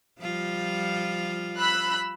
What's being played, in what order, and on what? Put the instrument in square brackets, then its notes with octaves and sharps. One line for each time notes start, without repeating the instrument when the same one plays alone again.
[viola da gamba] F3 G3 F4
[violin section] B5 E6 F#6